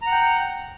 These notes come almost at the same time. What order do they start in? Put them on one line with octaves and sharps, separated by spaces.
A#5 F#5 G5